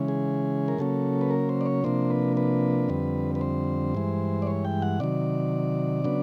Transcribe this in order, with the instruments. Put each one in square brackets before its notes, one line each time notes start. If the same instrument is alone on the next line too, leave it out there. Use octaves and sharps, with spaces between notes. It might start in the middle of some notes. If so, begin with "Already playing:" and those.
Already playing: [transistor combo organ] C#3 E3 G#3 C#4
G#4
A#4
C#3 F#3 A#3 C#4 A4
B4
A#4
C5
D5
C#5
C3 F3 A#3 D4 C5
B4
B4
F2 D3 G3 C4
B4
C5
G2 E3 G#3
D5
C#5
G5
F#5
C3 D#3 F#3 D5
C#3 F#3 B3 D4